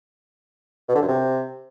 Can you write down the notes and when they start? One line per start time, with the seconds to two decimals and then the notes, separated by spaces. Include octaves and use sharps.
0.88 B2
0.95 D3
1.01 F#2
1.08 C3